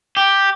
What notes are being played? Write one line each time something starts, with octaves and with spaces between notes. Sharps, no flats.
G4